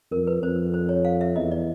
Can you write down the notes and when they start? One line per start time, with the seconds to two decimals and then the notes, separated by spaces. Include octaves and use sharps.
0.11 F2 A#4
0.27 B4
0.42 F2 C5
0.74 C5
0.89 C#5
1.05 F5
1.21 E5
1.36 E2 D#5
1.51 D5